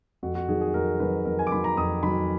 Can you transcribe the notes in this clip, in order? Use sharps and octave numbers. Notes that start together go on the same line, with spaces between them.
F2 F#4
F#4
D#3 F#3 G#4
G#4
F2 A#4
D#3 F#3 B4
F2 A#4
G#5
D6
D#3 F#3 B5
A#5
F2 D#6
D#3 F#3 B5